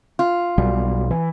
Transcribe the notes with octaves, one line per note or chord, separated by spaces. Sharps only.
F4
B1 B2 G3
E3